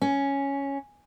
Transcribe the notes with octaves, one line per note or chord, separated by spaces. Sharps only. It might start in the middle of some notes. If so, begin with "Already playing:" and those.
C#4